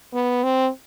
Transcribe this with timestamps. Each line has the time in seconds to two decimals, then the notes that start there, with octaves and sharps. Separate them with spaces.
0.14 B3
0.44 C4